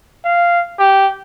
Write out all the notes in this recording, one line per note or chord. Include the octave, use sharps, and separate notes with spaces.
F5
G4